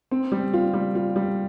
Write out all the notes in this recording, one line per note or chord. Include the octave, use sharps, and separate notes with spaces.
C4
G3
F4
G3
F4
G3